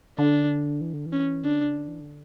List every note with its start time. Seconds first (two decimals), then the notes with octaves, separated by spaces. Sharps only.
0.18 D3 D4
0.81 E3
0.93 D3
1.06 E3
1.12 C#4
1.44 D3 D4
1.59 C#3
1.75 D3
1.88 E3
2.00 D3